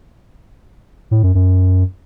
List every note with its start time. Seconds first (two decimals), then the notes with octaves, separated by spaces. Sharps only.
1.11 A2
1.23 F#2
1.35 F#2